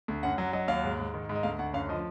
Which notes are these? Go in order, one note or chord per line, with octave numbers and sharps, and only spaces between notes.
D2
F#2 F#5
F#3
F#3 D#5
D#2 F5
G#2
G#2
D#3
G#2
D#5
D2 F5
D2 F#5
F#2 F5
F3 D#5